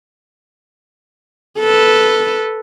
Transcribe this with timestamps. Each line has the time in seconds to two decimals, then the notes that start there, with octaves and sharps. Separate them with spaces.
1.60 A4 B4